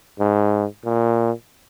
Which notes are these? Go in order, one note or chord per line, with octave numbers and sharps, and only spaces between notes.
G#2
A#2